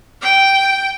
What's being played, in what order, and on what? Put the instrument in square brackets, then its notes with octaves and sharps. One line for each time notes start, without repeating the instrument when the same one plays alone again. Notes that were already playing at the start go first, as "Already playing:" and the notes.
[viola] G5